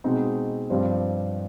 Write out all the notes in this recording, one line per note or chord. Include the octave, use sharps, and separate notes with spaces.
B2 G#3 C4 D#4
G2 F3 C4 G4 C5